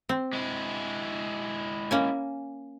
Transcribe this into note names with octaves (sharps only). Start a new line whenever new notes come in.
C4
G#3 E4
A#3 C#4 G#5